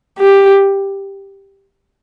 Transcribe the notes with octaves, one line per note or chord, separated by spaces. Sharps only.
G4